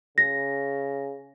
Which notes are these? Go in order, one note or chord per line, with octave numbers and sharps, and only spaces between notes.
C#3 A#6